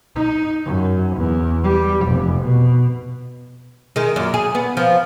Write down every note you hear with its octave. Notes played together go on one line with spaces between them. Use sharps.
D#4
F#2
E2
G3
F1
B2
D#3 G#3
F#2 A#2
G#4
B3
F3 B3